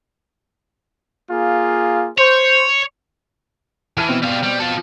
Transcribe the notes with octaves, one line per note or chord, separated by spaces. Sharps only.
A#3 F4 G#4
C5 C#5
E3 A5 F6 D#7
B2 C4
G3 F5
G3
F4 A4